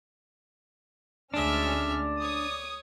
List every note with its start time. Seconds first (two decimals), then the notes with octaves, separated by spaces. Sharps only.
1.34 D2 G#3 C#4 D4 D5 E5 F6
2.21 C#5 D#6